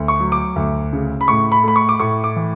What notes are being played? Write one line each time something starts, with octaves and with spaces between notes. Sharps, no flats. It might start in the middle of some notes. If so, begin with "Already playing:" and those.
Already playing: D2
C#6
F#3
D6
D2
C#3
B5
A2 C#6
B5
A3 B5
C#6
D6
A2 C#6
D6
E3